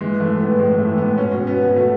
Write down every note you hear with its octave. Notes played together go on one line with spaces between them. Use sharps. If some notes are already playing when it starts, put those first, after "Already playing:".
E3 G#3
E3 A3
E3
B3
A2
A2 G#3
E3 A3
E3
B3
A2
B2 C#4
B2
B2 B3
B2
B2 A3